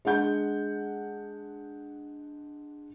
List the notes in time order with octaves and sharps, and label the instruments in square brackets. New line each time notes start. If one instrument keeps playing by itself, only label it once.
[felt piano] G#3 D4 F#5 G6